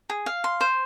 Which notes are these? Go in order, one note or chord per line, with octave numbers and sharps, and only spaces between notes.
G#4
F5
C6
C5